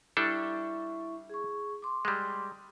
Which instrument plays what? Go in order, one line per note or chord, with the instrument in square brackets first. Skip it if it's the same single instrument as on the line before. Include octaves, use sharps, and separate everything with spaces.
[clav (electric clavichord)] G3 D4 A4 [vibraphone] E4 E5 C#6
[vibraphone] G#4 C#6
C6 D6
[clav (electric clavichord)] G3 G#3